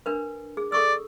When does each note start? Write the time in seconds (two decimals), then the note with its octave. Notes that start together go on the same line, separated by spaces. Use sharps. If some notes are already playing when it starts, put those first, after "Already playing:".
0.06 D4 A#4 B4
0.57 G#4
0.72 A4 D5 C#6 E6